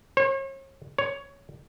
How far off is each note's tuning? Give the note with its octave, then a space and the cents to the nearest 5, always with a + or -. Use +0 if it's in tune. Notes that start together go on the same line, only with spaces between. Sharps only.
C#5 -40
C#5 +10